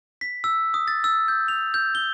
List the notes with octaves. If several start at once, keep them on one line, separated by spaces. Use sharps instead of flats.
B6
E6
D#6
A6
E6
G6
F7
G6
G7